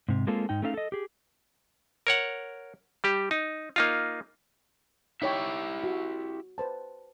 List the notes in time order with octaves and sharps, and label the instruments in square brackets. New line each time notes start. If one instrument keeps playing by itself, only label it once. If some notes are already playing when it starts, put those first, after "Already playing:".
[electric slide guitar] G#2 C3
G#3 A#3 C4 F4 A4
G#2 D#4 G5
A3 C#4 D#4 A4 D#5 F5
A4 D#5
G4 G#4
[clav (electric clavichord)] A#4 C#5 F#5
G3 G4
D#4
A#3 D#4 F4
[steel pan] D#4 C#5 G5 [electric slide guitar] E4 G4 E5
[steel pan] F#4
B4 C5 A5